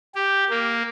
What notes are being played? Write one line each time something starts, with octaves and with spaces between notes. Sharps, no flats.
G4
A#3